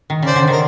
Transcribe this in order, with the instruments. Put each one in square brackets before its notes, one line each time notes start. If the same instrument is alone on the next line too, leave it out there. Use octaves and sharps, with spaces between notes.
[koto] D#3
[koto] C#3 [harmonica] C5 D5
[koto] D3
[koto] D#3 [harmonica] A#4